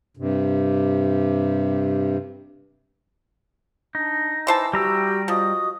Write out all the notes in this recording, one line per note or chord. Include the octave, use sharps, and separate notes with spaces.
G2 C3
D4 D#4
E3 C5 A5 E6
G3 F#4 G4 G5 A#5 E6
F3 F#4 D#5 D#6